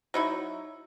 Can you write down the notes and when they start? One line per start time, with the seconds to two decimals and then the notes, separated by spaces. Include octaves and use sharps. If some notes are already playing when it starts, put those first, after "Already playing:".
0.14 F#3 D#4 E4